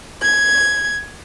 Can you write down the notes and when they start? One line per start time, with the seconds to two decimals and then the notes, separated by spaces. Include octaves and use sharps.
0.19 G#6